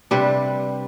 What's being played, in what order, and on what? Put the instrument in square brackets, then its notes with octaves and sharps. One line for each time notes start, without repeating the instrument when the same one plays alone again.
[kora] C3 G3 D4 B4